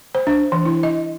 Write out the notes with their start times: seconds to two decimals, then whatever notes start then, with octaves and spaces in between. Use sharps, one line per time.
0.15 C5
0.27 D4
0.52 E3
0.65 E4
0.83 D#5